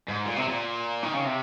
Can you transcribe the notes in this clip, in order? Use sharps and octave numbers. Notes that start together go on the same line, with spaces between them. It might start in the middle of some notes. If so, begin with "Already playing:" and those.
G#2
A#2
C3
A#2
D#3
C#3
C3